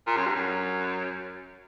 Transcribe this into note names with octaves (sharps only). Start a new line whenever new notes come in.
A#2
F#2
G2
F#2